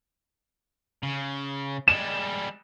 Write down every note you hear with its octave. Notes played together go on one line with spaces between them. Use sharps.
C#3
G3 G#3 E7